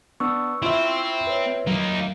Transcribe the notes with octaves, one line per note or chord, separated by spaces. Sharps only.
B3 D4 C#6 E6
C4 E4 F4 E5
B4 C#5
F#3 A#3 D#4